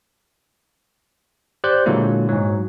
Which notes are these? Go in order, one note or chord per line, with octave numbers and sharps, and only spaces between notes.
G4 C5 D5 G5 F#6 G6
A#2 D3 F#3 G#3 A#3 E4
G#2 F#3